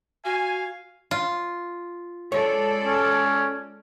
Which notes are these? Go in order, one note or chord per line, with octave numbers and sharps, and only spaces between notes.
F#4 F5 G#5
F4
G#3 A4 C#5 D5
C#4